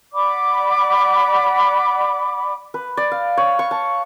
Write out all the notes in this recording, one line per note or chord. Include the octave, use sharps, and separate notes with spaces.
D5 F#5 B5 D6
B4
D5
F5
C#5
C#6
A5